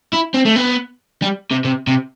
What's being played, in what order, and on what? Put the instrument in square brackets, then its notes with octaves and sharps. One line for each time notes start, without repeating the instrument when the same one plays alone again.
[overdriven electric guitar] E4
C4
A3
B3
G3
C3
C3
C3